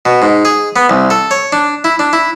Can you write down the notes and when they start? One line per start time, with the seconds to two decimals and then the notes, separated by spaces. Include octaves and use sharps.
0.05 B2
0.22 G#2
0.45 G#4
0.76 B3
0.90 C2
1.10 A4
1.31 C#5
1.52 D4
1.84 E4
1.99 D4
2.13 E4